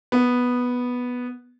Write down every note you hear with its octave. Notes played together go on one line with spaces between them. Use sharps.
B3